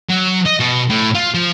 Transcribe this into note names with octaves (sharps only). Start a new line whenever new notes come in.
F#3
D#5
B2
A2
F4
F3